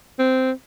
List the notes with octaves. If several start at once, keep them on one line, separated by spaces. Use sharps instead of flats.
C4